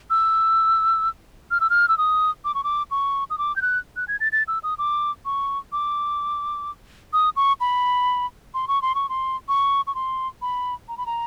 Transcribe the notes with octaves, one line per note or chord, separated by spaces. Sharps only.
E6
F6
E6
F6
E6
D#6
D6
C#6
D6
C#6
D#6
D6
G6
F#6
F#6
G#6
A6
A6
E6
D#6
D6
C#6
D6
D#6
C#6
B5
C6
C#6
C6
C#6
C6
C#6
C#6
C6
B5
A#5
B5
A#5